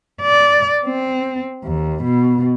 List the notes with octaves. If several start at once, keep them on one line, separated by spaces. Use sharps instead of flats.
D5
C4
D#2
B2